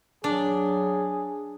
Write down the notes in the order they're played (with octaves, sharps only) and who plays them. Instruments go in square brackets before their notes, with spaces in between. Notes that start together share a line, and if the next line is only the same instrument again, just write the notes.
[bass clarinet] F#3 [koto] D4 [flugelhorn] G#4